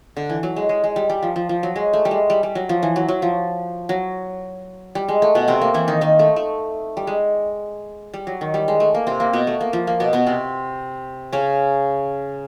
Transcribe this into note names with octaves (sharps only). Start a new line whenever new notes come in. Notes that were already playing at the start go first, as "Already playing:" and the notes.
D3
E3
F#3
G#3
G#3
G#3
G3
G3
F3
F3
F3
F#3
G#3
A3
G3
G#3
G3
G3
F#3
F3
E3
F#3
F#3
F3
F#3
G3
G#3
A3
B2 B3
C3 C4
A#3
E3 E4
D#3 D#4
D#3 D#4
A3
A3
G3
G#3
G3
F#3
D#3
G3
G#3
A3
A#3
C3 C4
A#3
B2 B3
A3
A#3
F3
A#3
B2 B3
B2 B3
C3 C4
C#3 C#4